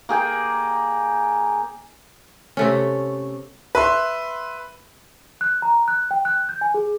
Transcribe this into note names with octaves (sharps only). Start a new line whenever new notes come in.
A#3 G#4 G5
C3 A3 C#4
B4 E5 C6
F#6
A#5
F#6
G5
F#6
G6
G#5
G#4